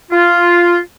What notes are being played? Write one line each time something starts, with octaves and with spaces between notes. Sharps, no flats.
F4